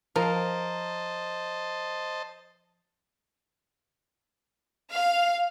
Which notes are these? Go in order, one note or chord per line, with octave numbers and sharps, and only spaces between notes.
F3 A#4 C5 D#5 A5
F5